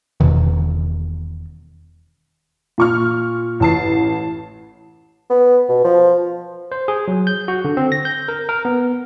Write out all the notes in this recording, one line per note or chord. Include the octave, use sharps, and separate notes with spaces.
E1 E2 B2 D#3
A#2 C#6 F6
A1 A5 C7
B3
B2
F3
C5
G#4
F#3
G6
F#4
D3
C4
A#6
G6
A#4
A#4
B3